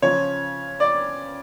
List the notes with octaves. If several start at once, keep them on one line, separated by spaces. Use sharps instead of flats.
C#3 F3 C#5
D5